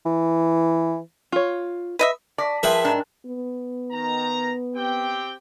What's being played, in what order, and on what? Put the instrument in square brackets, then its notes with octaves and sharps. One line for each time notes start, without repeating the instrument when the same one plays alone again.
[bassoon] E3
[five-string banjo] F4 C#5
[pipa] B4 D#5 E5
[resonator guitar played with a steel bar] D5 [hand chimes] A5 A#6 B6
[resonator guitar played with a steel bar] F3 [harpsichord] G#4 B4 E5 [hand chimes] A#4 G5 A5
[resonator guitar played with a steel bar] G#2 D4
[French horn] B3
[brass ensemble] D#3 A#5
C4 G4 G5